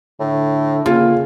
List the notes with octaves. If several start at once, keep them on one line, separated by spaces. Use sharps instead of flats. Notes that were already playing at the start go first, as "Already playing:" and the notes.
A2 D3
C#3 A#3 F4